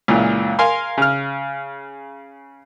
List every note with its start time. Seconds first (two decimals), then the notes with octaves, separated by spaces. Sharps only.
0.08 C#2 A#2 E3
0.59 A#4 F5 G#5 C6
0.97 C#3 F6